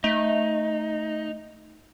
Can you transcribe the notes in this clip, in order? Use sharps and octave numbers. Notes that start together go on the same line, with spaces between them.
A3 D#4